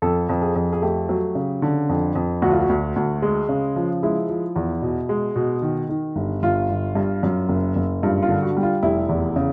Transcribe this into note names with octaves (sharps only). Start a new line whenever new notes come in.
F2 A4
F2
G#4
F2
G#4
A3 G4
F#3
C#3
D3
F2
F2
D2 F#4
F4
F#4
D2
D2
G#3
C#3
F3
G#3 E4
F3
E2
B2
G#3
B2
D#3
D#3
G1
G1 F4
G1
G2
F#2
F#1
F#1
G2 F4
F4
D3
F#4
G3
F4
F1 E4
E2
C#3